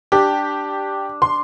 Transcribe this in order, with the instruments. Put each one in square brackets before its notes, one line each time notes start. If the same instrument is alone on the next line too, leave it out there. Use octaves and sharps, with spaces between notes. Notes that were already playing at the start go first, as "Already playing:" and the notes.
[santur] D4 [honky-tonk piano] G4
[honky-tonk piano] C6